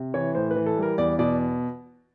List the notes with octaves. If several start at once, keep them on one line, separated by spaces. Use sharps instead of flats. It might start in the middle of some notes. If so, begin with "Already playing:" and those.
Already playing: C3
E3 C#5
A2 C5
B4
E3
A4
G3
A#4
E2 D5
B2 D5